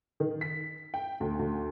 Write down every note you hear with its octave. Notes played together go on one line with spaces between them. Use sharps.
D#3
B6
G5
D2
D2